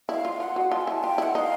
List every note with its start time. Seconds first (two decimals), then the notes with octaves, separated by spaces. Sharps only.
0.09 E4 F5
0.25 F4
0.40 F4 F#5
0.56 F#4
0.72 F4 A5
0.81 G#5
0.87 E4 A5
1.03 F4 G5
1.18 E4 F#5
1.35 D#4 F5 F#5